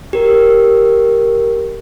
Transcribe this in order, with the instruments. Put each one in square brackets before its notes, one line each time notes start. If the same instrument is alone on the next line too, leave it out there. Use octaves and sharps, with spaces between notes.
[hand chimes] G4 A#4